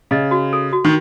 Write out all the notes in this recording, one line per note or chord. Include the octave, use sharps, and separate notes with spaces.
C#3 D#5
F#4
A4
F#4
D#3